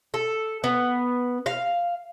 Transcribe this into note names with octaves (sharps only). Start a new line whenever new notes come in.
A4
B3
F5